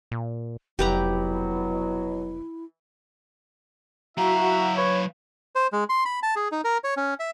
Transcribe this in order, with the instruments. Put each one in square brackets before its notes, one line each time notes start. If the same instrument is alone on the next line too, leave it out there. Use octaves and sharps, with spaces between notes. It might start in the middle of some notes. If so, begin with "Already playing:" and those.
[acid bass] A#2
[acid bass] F1 [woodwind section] B2 F#3 [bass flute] E4 [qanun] G4 B4 A#5
[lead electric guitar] F#3 F5 [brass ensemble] E4 F#4 E5 [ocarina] A#5
[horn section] B4 C#5
[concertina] C5
G#3
C6
B5
A5
G#4
D#4
A#4
C#5
C#4
E5